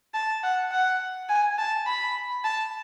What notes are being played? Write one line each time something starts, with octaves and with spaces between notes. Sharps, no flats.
A5
F#5
F#5
G#5
A5
B5
A5